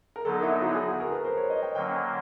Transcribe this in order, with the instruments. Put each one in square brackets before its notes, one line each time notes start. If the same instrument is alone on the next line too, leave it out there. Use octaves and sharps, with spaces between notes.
[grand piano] A#4
[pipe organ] D3 F#3 B3 D#4 [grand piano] A4
[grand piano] E4
F#4
G#4
A4
A#4
B4
C5
C#5
D#5
G5
[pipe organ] D3 F#3 A#3 C#4 [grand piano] G5
[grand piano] G#5